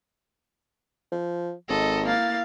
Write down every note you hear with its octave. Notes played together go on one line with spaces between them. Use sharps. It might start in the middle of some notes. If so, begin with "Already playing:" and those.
F3
G#1 A4 D#5
A#3 E4 F5 A6